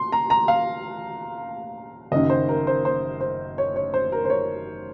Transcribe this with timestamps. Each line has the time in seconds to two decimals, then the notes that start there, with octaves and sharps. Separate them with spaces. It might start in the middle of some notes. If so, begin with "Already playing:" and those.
Already playing: C6
0.12 A#5
0.30 A#5
0.48 F5
2.12 F#1 F#2 D#3 D#5
2.30 C5
2.49 A#4
2.67 C5
2.85 C5
3.21 C5
3.58 C#5
3.76 C#5
3.94 C5
4.12 A#4
4.25 C5
4.30 C#5